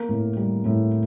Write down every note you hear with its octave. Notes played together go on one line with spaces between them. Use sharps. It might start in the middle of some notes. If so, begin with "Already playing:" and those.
Already playing: A#3 A#4
A2
G3
A2